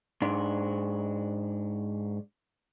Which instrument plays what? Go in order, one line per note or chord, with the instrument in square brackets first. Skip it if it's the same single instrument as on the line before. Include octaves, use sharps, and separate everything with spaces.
[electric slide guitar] G#2 D4